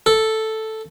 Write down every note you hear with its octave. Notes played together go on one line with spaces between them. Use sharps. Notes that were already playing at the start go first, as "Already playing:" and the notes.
A4